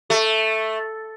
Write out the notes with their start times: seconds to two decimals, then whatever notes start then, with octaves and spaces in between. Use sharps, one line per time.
0.10 A3